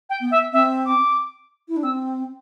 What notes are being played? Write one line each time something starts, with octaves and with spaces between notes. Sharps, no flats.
G5
B3
E5
C4 E5
D6
E4
D4
C4 E6